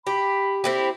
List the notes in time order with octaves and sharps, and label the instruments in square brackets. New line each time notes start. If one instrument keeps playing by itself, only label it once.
[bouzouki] G4 [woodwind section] B5
[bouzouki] C4 E4 G4 [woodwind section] A4